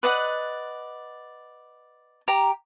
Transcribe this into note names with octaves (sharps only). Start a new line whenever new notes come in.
B4 D5 D#5 F#5
G4 A#5